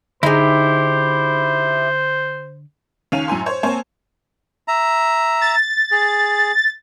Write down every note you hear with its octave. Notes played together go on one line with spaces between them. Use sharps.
D3 D#4 E4 G4 G#4 C5
D#2 C#4 F5 D#7 F7
F#2 A2 G#5 C6
C5 C#5
A#3 C4 C5 C#5 G#5 A5
E5 A#5
A6
G#4